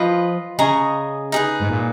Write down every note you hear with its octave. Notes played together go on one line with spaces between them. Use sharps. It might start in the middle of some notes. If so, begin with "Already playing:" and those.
Already playing: F3 F4 B4 D#5
C#3 G#4 D#5 A#5 C#6
D#4 G#4 B4
G#2
A#2